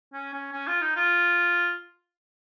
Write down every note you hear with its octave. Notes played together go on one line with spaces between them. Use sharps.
C#4
C#4
C#4
F4
D#4
F4